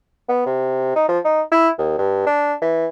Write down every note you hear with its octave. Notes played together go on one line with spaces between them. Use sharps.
B3
C3
D#4
F3
D#4
E4
D#2
G2
D4
E3